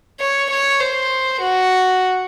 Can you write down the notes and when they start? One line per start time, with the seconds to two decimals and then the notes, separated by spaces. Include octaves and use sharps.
0.20 C#5
0.51 C#5
0.81 C5
1.41 F#4